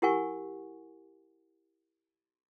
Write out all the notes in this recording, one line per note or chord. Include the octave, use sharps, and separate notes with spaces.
E4 G4 A#4 F#5 G#5 C#6